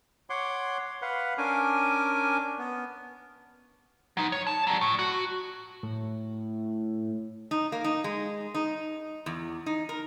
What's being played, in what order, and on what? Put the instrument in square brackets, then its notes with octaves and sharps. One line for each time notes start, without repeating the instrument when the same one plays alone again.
[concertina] C#5 F#5 C6 D6
B4 F5 F#5
C#4 D4 A#4 G#5 D6
B3
[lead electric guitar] F#3 D#4
C#5
A5
F#3 G3
A2
F#4
[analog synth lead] A2
[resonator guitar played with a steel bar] D#4
A#3
D#4
G#3
D#4
E2
D#4
A#4